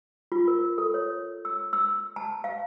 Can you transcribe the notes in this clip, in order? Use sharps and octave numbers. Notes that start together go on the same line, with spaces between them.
F4
A#4
A4
C#5
E6
E6
A5
F5